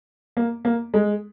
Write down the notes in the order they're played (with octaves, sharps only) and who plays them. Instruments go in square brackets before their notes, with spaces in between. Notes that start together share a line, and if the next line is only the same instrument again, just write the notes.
[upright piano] A#3
A#3
G#3